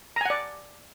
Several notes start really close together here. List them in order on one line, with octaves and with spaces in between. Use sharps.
A#5 G#5 F#5 D5